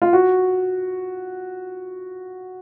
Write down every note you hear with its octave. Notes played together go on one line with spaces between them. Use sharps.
F4
F#4